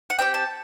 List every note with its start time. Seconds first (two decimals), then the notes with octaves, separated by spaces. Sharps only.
0.10 F#5
0.19 C4 E4 G4 G5
0.34 A5